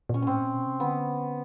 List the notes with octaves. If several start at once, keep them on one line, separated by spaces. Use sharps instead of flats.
A#2 C#4
A2 C4 C#4
A#2
B2
C3
D3 B3